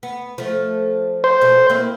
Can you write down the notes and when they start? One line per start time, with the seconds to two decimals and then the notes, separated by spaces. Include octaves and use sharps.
0.03 B3
0.38 F3 A3
1.24 C5
1.41 B2 A3
1.70 A#3 C4 E4